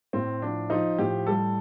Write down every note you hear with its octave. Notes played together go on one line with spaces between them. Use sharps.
A2 C4
F3 D4
F3 D#4
A2 G4
G3 A4